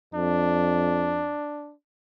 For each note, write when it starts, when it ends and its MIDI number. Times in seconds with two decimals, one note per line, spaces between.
0.14 1.37 41
0.14 1.74 62